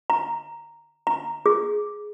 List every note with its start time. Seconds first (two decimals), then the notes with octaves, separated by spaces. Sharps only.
0.10 A#5
1.07 A#5
1.46 G#4